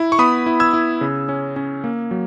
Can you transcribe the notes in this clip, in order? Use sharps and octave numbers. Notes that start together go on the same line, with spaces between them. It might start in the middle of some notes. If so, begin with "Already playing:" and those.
Already playing: E4
C#6
B3 B5 D#6
E4
E6 G#6
E4
C#3
C#4
C#4
A#3
F#3